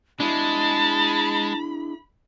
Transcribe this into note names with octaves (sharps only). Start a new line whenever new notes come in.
G#3 D4 E4 G#4 A5 B5